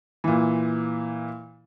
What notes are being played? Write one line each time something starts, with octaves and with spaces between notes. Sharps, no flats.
A#2 E3